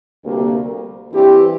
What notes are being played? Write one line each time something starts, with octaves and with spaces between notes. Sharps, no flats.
D2 C3 G3 A#3
G2 E3 G3 C4 G4